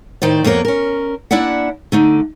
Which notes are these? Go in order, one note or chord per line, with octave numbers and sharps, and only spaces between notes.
A2 D#3 C5 D5
F2 A#3 B3 A#4 C#5
C#4 A#4
A#3 D4 E4 D5 E5 F#5
D3 A3 D#4